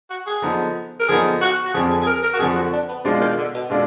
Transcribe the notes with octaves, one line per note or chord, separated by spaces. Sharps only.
F#4
G#4
D3 F3 B3 D#4
A#4
D3 F3 B3 D#4 G#4
F#4
F#4
F2 D3 F3 G#4
G#4
G#4
A#4
A#4
F#4
F2 D3 F3 G#4
F#4
D4
B3
B2 F3 G#3 D4 F4
D#3
D3
B2
B2 D3 G#3 D4 F4